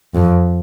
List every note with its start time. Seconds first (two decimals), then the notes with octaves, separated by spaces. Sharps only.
0.15 F2